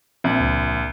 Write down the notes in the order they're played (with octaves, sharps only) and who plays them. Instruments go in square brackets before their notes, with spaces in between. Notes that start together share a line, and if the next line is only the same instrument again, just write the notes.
[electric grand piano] A#1 [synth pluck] C4 E5 G#6
[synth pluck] C#2